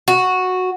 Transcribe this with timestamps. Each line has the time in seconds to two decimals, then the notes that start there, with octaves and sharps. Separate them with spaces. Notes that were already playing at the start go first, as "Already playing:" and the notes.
0.08 F#4